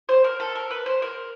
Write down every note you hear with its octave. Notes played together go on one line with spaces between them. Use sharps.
C5
A#4
A4
A#4
B4
C5
A#4